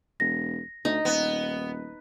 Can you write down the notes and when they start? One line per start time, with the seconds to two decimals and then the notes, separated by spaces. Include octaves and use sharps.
0.20 E1 A#6
0.85 D2 D#4
1.05 D#1 B3